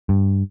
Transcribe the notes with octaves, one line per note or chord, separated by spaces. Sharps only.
G2